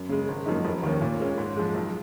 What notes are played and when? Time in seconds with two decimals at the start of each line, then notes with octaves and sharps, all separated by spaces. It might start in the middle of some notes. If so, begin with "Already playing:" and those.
Already playing: F#2
0.09 C#3 G#3
0.28 G#1
0.46 F#2 F3 A#3 D#4
0.65 F1
0.83 D#2 D#3 A#3 C#4
1.01 A#2
1.20 G#3 C#4
1.38 G#2
1.56 F3 G#3
1.74 B1